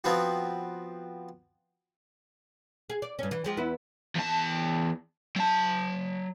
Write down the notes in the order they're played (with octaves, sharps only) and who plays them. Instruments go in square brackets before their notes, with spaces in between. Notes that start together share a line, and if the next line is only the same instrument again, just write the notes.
[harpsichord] F3 B3 C4 F#4
[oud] G#4
D5
G2 C#4
E3
F3 G#3 G4
E2 B3 E4
[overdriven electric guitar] E2 A5
F#3 A5